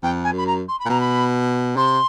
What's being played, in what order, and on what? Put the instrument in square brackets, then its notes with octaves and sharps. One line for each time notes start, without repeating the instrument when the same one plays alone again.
[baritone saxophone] F2 [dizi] G5
[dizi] G#5
[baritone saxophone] F#2 [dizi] B5
[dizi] A#5
C6
B5
[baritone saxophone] A#2
[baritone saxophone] B2 [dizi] A#5
[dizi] B5
[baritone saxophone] C3 [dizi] C6